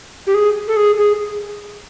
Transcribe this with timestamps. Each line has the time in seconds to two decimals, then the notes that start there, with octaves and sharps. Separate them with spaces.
0.27 G4
0.34 G#4
0.68 A4
0.76 G#4
0.98 G#4